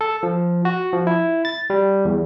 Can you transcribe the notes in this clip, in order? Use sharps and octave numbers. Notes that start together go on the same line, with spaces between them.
A4
F3
F#4
F3
E4
A6
G3
E2